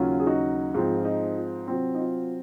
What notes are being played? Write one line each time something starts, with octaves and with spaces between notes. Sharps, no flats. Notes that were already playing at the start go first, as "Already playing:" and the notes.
Already playing: D#2 C#3 F#3 C#4 F4
G#4
D#4 F#4
G#2 F3 C4 F4
F4
D#4
F4
C3 F#3 C4 F4
D#4
F4